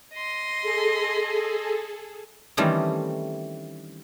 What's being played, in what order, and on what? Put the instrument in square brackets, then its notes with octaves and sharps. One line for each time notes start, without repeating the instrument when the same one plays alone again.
[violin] D#5 C6
[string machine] G#4 A4
[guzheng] D#3 E3 G3 A3 C4 C#4